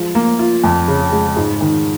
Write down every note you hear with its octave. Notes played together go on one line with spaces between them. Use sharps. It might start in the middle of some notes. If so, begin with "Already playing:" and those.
Already playing: F3 G#3
A#3
F4
F2
C#3
G#3
G#2
D#3